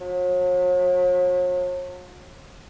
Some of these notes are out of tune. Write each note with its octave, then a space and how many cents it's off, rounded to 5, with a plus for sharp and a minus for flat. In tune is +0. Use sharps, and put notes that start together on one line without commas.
F#3 -45